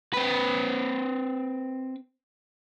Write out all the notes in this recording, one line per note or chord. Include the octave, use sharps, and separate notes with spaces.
C4 B4